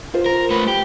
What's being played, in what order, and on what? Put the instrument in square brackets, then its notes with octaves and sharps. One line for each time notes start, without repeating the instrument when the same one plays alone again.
[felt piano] F4 C5
[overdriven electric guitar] A#4
A3 B4
G4